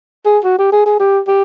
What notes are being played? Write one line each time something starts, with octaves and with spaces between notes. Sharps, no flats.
G#4
F#4
G4
G#4
G#4
G4
G4